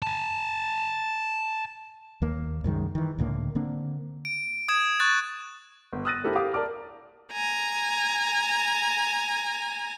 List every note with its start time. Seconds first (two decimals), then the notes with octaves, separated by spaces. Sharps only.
0.02 G#5 A5
2.22 D#2 A#3
2.64 C2 F#2 D#3 G#3
2.95 D#3 E3
3.18 C#2 A2 D3 A#3
3.55 D3 A#3 C4 D4
4.25 D7
4.68 D#6 G#6 E7
5.00 C#6 F#6 A6
5.93 G1
6.05 D#6 E6 F#6 A6 A#6 D#7
6.24 D4 E4 G4 A4 A#4 C5
6.35 G4 F5 D6 D#6
6.53 A#4 D5 A5 D6 F6
7.32 G#5 A#5